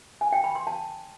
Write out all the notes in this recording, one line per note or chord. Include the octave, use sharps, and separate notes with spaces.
G#5
G5
B5
C6
A5